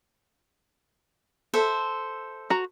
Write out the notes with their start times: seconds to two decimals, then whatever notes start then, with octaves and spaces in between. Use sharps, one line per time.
1.54 A4 C5 E5
2.50 F#4 A#5